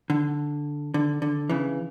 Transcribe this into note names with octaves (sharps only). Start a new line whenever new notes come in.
D3
D3
D3
C#3 E3